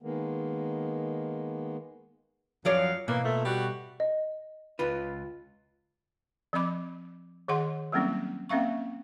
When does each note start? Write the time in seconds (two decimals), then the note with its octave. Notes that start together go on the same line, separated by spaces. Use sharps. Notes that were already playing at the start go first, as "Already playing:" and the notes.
0.02 D#3 G#3 A#3 B3
2.65 F#2 F3 F#3 D5 F5
3.08 B2 E3 A#3
3.25 A#2 A3
3.45 G3 F#4
4.00 D#5
4.79 C#2 F4 B4
6.53 F3 C4 D#5 B5 D6
7.48 D#3 G#4 D#5 F#5 C6
7.92 F#3 G3 A#3 C4 C#4 E4
8.49 A#3 C4 C#4 E5 F5 C#6